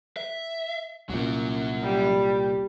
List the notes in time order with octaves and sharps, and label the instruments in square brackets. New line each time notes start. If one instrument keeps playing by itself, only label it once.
[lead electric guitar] E5
[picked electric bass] C2 A#2 [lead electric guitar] F#3 C#4
[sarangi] G3